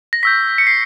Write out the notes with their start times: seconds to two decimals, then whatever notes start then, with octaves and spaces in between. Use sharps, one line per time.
0.13 A#6
0.23 C#6 E6 G6 B6
0.58 C#7
0.67 C7